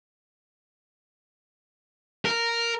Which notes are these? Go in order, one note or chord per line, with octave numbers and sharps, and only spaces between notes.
A#4